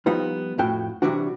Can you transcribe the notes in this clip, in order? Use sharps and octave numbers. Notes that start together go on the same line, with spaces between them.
F3 G3 B3 D#4 F4
F2 A2 F#4 G5
C3 E3 F#3 G3 D4 F#4